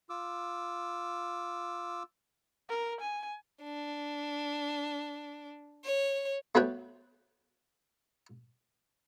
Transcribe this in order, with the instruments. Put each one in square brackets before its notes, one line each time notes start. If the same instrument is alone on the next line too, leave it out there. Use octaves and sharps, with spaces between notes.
[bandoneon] F4 D6 E6
[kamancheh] A#4
G#5
[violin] D4
C#5
[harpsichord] A3 B3 F#4 B4 C#5 G5